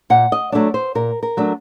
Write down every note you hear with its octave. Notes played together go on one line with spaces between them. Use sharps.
A#2 F#5
D#5
F#3 A3 D4 D5
C5
A#2 A#4
A#4
F#3 A3 D4